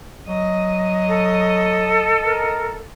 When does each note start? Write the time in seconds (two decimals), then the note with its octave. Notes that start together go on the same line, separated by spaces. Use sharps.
0.28 F#3 D#5
1.08 A4
2.26 A#4